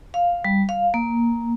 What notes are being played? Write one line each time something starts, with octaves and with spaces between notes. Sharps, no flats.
F5
G3
F5
A#3